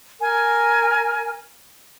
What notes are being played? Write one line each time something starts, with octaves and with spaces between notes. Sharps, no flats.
A#4 G#5